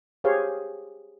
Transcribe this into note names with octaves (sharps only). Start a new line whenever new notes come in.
G4 G#4 C5 C#5 F5